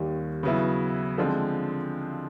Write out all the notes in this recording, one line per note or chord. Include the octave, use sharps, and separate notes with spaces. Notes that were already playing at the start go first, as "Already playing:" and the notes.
Already playing: D#2 D#3 G3
C#3 F#3 B3 E4
D3 F3 G#3 C4